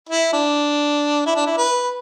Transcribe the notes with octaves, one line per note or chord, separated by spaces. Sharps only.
E4
D4
E4
D4
E4
B4